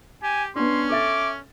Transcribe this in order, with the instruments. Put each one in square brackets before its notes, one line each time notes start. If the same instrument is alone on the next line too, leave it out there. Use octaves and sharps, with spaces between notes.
[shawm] G4 [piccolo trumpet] G#5
[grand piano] B3 D4 [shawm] C#4 [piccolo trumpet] C6
[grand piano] A4 E5 A6 [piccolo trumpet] D6